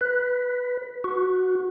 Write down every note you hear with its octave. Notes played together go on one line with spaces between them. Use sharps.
B4
F#4